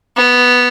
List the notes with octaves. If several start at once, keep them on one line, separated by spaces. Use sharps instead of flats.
B3